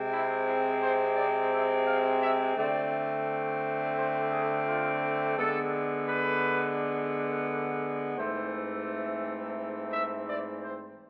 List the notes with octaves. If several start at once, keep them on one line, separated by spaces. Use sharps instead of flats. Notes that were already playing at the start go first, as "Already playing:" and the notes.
Already playing: C3 G#3 C4
E4
E4
C5
D5
E5
F5
E5
D3 A3 C4 D5
C5
G#4
F4
D3 G#3 B3 A4
B4
G#2 E3 A3 C4 C5
E5
D5
C5